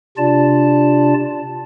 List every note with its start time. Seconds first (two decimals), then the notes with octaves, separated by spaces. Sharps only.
0.18 C3 D4 F4 D5 A5